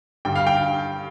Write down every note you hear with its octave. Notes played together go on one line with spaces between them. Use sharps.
G2 D3 G3 G5
F5
G5